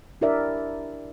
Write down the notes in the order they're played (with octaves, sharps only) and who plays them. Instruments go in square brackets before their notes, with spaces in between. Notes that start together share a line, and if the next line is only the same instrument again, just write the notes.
[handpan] D4 E4 G4 A#4 D5 E5